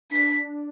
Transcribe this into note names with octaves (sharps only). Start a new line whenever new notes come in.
D4 B6